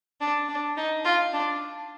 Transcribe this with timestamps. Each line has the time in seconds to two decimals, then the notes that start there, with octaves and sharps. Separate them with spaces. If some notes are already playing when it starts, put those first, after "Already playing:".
0.21 D4
0.49 D4
0.77 D#4
1.05 F4
1.33 D4